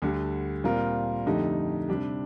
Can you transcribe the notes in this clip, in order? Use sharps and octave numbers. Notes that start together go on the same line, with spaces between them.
D2 D3 G3
A#2 G3 C4 F4 A#4
F2 D3 A3 D#4 G4
C3 G3 D4 G4